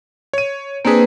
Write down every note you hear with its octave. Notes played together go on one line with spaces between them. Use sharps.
C#5 D#7
A#3 C4 D4 G#4 B4